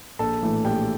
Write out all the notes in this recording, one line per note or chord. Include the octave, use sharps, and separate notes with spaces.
A#1 A4 A5
A2 E3 A3
A#1 G4 G5